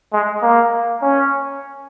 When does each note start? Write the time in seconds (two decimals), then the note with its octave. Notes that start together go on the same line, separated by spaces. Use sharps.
0.13 G#3
0.42 A#3
1.02 C#4